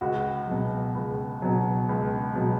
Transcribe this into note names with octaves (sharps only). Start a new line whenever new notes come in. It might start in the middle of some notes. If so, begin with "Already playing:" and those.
C#2 F#4
B2 F#3
C#2
B2 F#3
C#2
B2 F#3